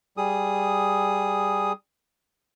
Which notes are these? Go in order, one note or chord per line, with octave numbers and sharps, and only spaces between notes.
G3 G#4 D#6